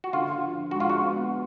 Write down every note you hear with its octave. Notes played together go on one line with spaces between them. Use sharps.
F#4
D3 F4
F3
G#3 F#4
F4
F#4
B3